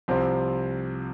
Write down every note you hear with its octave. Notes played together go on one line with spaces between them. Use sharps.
C2 C3 F3 C4